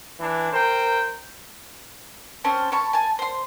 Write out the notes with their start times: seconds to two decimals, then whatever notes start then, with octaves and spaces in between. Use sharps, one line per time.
0.20 E3 D4
0.52 A#4 C5 G5
2.44 C4 C#4 C5 A5
2.72 C#5 A5 B5 C#6
2.93 G#5 A5
3.19 C5 C6